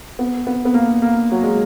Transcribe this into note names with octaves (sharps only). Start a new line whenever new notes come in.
B3
B3
B3
A#3
A#3
F#3
G#3